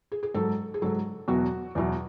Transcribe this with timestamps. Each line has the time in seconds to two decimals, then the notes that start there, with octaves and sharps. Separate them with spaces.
0.12 G#4
0.23 G#4
0.34 G#2 F#3 A4
0.74 G#4
0.82 G#2 F#3 A4
1.28 E2 B2 F#3 F#4
1.75 E2 B2 F#3